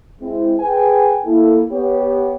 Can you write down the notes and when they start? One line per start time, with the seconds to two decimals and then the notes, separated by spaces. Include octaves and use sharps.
0.21 G#3 C4 E4
0.59 G#4 B4 G5 G#5
1.26 A#3 E4 A4
1.72 B3 G4 C#5